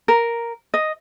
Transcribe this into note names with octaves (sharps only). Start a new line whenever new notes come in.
A#4
D#5